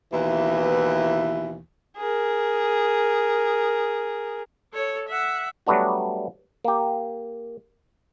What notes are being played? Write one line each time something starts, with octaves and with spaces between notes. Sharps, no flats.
D#2 B2 E3
G#4 A#4
A4 C#5
E5 F#5
F#3 G3 A3 B3 D4 F#4
A#3 G4